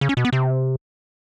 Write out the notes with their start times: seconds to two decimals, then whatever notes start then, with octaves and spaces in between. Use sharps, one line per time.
0.01 C#3
0.09 C#4
0.17 B2
0.25 B3
0.33 C3